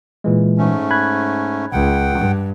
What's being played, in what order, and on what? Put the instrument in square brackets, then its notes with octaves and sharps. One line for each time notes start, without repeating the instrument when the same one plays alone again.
[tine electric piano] A#2 E3 G#3
[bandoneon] G#2 A3 C#4
[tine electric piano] B5 F#6 G#6
[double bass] C#2 [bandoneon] F#5 G5
[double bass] G2